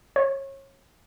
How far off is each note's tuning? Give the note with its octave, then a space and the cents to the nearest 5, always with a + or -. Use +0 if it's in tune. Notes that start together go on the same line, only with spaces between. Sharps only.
C#5 -30